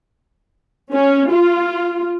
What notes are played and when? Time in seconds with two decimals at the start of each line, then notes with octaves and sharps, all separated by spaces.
0.92 C#4
1.31 F4